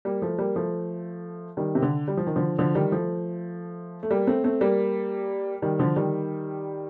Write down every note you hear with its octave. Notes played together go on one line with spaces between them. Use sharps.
G3 A#3
F3 A3
G3 A#3
F3 A3
D#3 G3
C3
D3
G3
F3
D#3
D3 F3
D3 F3
D#3 G3
F3 A3
A3
G3 A#3
A3 C4
A3 C4
G3 A#3
D#3 G3
D3 F3
D#3 G3